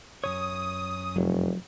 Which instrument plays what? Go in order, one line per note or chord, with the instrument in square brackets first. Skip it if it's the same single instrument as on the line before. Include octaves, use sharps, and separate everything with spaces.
[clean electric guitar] F#2 C#3 C#5 [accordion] D#6
[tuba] F1 [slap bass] F#3